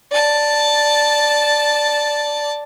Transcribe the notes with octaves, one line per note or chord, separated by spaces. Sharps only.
D5 A5